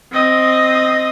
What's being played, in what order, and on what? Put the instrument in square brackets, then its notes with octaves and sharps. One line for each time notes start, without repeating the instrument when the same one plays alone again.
[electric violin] C4 D#5